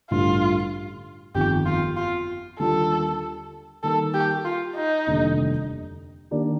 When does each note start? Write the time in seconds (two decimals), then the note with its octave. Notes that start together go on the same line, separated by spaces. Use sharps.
0.11 A1 G2 D3 G3 F4
1.35 G1 F2 D#3 G4
1.66 F4
1.97 F4
2.59 D#2 D3 G3 A#3 F4 A4
3.83 D#3 G3 A#3 D#4 A4 A#4
4.14 G4
4.45 F4
4.76 D#4
5.07 F1 D#2 D3 G3 D4
6.31 D#3 A#3 D4 G4 D5